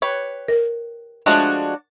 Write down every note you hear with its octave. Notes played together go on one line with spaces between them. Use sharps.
G4 B4 C#5
A#4
F3 G#3 A3 D4 F#4 C#5